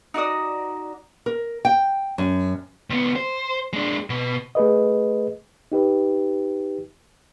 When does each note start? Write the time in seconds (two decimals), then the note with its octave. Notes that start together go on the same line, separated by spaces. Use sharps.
0.14 D#4 F#4 D5 D#6
1.26 A#4
1.65 G5
2.18 F#2
2.90 C#2 B3
3.16 C5
3.73 G#3 D4
4.10 B2
4.55 A3 G#4 B4 D#5
5.72 D#4 G4 B4